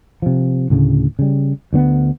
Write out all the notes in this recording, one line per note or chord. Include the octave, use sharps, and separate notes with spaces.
C3 F3
D2 A2 C#3
C#3 G3
D2 D3 A#3 B3